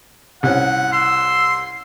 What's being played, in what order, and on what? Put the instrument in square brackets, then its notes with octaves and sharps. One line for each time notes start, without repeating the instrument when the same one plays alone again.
[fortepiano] C2 C#4 [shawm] F#5
[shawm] C6 [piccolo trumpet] E6